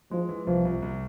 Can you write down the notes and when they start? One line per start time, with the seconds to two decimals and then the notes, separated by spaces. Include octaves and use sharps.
0.11 F3 G#3
0.29 E3
0.46 C2 F3
0.65 C2
0.82 C2